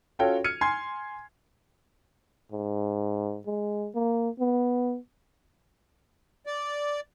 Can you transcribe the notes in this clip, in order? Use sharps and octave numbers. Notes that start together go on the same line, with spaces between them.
C#4 F4 F#4 A4 C#5 G5
F6 G#6 C#7 D#7
G#5 C6 G#6 C7
G#2
G#3
A#3
B3
D5